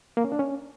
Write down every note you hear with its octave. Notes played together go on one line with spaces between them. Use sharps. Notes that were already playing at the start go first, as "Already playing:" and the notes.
A#3
C#4
D4
C#4